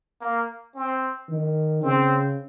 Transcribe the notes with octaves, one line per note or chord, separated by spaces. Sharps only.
A#3
C4
D#3
C#3 C4